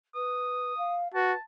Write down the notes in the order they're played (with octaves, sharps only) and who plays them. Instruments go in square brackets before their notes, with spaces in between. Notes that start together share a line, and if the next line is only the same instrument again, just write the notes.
[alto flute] B4 [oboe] D#6
[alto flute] F5
[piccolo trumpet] F#4 [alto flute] B4 [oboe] A5